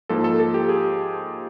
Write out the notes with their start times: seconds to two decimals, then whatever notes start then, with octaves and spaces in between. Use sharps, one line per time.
0.09 G#2 F3 A#3 A4
0.24 A4
0.40 A4
0.54 G4
0.69 G#4